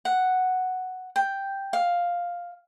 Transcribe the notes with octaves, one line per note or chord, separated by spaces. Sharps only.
F#5
G5
F5